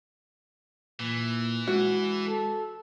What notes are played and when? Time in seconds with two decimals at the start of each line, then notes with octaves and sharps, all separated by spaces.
1.00 A#2 E3
1.67 G#3 F#4
2.27 A4